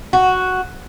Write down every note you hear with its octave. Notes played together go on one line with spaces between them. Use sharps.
F#4